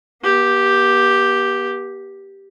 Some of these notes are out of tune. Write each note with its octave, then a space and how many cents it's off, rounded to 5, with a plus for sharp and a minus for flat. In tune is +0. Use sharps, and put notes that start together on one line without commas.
B3 -45 G4 +0